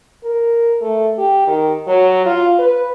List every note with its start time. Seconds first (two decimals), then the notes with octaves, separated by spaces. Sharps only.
0.24 A#4
0.81 A3
1.18 G4
1.47 D#3
1.87 F#3
2.26 F4
2.59 B4